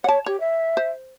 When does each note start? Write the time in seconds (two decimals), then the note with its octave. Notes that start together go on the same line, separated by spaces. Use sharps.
0.04 C#5 F#5 A5
0.26 G4 C#5
0.40 E5
0.77 C5